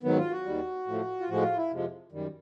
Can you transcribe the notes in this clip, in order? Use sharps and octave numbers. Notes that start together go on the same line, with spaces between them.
G#2 D#3 F#3 B3
F4
F#4
D#2 D#3 G3
A2 F3 A3
F4
A2 F3 G#3 F#4
F4
E4
F2 C3 F3 G#3
F#2 D#3 G3